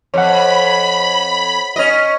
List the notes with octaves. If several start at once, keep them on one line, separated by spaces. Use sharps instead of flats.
F2 C#5 F#5 B5
C#4 D#5